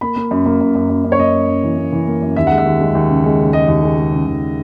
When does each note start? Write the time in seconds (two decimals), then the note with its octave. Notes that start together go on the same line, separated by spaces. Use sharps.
0.01 A#3 B5
0.16 A#3
0.31 F#2
0.46 A#3
0.61 F#2
0.75 F#2
0.89 F#2
1.04 F#2
1.12 C#5
1.19 A#3 D#5
1.34 F#2
1.48 F#2
1.63 E3
1.78 A#3
1.92 E3
2.07 A#3
2.22 F#2
2.36 D#2 E5
2.47 G#3 F#5
2.58 E5
2.66 D#2
2.80 G#3
2.95 D#2
3.09 C#3
3.24 G#3
3.39 C#3
3.53 G#3 D#5
3.68 D#2
3.83 G#3
3.97 G#3
4.12 C#3
4.26 D#2